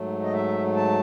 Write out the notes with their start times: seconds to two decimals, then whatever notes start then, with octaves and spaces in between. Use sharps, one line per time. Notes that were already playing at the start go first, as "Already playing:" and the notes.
Already playing: G#2 F#3 A3
0.23 D#5
0.33 E5
0.76 A5